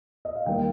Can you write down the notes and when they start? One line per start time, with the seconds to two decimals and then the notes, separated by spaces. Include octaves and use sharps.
0.25 D#5
0.36 F5
0.46 D#3 G3 A#3 G5